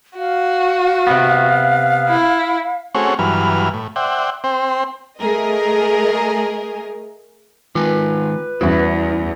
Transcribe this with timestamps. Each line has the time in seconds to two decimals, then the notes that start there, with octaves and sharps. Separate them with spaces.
0.18 F#4 F5
1.07 C3 B3
2.09 E4
2.95 A3 C4 C#4 F#4 G#4 C#5
3.19 G2 E3 F#3 B4 F6
3.74 A2
3.96 C5 D5 E5 F#5 G5
4.44 C4 C5 G5
5.18 A3 G#4 A#4 D#5
7.75 D#3 G#3 F4 B4 G#5
8.61 E2 G3 E4 F#4